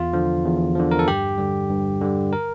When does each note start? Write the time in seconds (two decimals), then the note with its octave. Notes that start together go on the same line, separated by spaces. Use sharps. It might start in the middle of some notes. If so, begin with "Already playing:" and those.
Already playing: E2 F4
0.13 D3 F3
0.45 E2
0.75 D3 F3
0.91 A#4
0.99 A4
1.08 G2 G4
1.38 D3 G3
1.70 G2
2.01 D3 G3
2.33 A#4